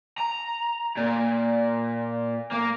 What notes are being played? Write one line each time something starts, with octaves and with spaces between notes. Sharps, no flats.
A#5
A#2
A#3